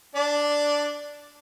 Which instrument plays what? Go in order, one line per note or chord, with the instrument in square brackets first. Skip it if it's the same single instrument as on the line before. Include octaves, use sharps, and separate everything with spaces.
[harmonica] D4 D5